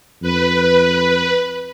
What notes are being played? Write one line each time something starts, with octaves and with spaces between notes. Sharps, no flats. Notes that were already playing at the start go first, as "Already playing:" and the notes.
F2 B4